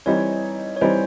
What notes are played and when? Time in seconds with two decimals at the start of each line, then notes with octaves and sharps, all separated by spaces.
0.06 E3 G3 C4 D#4 C#5
0.76 C#5
0.81 E3 G3 C4 D#4 C5